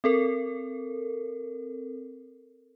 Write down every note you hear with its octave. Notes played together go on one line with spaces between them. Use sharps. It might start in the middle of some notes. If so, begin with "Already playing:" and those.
C4 A4 A#4